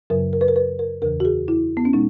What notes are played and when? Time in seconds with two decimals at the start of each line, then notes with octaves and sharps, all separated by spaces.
0.10 F#2 C#3 F#3 A#4
0.33 A#4
0.41 B4
0.48 A#4
0.56 B4
0.79 A#4
1.02 E2 C#3 E3 A#4
1.20 F#4
1.25 G#4
1.48 E4
1.77 B3
1.85 C#4
1.93 B2 G#3 D#4